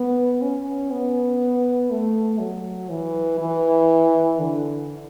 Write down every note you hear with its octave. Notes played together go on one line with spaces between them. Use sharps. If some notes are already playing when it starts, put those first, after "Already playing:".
Already playing: B3
C#4
B3
A3
F#3
E3
E3
D3